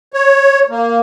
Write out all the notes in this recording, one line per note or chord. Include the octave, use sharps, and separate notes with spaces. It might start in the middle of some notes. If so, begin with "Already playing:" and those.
C#5
A#3